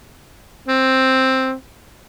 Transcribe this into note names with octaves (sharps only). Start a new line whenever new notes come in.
C4